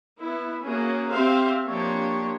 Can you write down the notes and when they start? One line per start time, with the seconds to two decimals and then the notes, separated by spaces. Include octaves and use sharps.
0.20 B3 E4
0.64 A#3 C#4 F#4 G#4
1.12 C4 G4 C5 E5 F5
1.68 F3 A#3 D4 G4 C#5